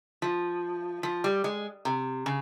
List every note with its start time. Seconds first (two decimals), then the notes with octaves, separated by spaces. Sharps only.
0.22 F3
1.03 F3
1.24 G3
1.44 G#3
1.85 C3
2.26 C#3